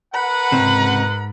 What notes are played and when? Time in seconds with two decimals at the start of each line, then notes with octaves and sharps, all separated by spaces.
0.14 A#4 B4 F#5 B5
0.52 C#2 G#2 C3